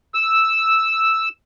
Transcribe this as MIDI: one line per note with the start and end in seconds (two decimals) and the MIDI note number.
0.14 1.29 88